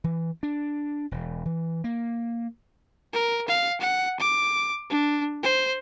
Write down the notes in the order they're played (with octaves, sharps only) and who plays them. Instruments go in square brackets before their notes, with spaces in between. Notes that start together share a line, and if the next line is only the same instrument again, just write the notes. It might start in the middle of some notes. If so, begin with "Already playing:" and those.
[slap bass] E3
D4
E1
E3
A#3
[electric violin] A#4
F5
F#5
D6
D4
C5